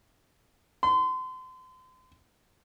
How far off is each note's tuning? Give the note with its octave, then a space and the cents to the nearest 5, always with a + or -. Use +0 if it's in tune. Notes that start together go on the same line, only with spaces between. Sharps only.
C6 -35